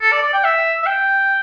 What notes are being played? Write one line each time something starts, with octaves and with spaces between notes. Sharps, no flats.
A4
D5
D5
G5
E5
E5
G5